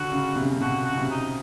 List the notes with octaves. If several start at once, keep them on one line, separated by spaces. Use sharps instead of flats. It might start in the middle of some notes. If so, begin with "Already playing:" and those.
Already playing: D3 F#4
C#3
C3
C#3
C3
B2 F#4
F#4
C#3
C3
D#4